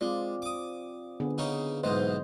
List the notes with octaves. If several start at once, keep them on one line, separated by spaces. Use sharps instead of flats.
G#3 C4 F4 D5
D6 D#6
D3 B3 G#4
C#3 D#4 C#5
B1 G#2 E3 C5 D#5